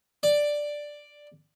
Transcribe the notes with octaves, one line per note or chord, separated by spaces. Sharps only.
D5